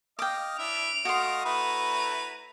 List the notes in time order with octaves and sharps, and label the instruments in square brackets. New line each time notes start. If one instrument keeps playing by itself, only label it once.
[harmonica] D#5 F5 [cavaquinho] G5 D6
[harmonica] D4 E4 E5 [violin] D7 F7
[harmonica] A3 D#5 F5 [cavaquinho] F#4 C6
[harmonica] A3 E4 B4 [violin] A#5 D#7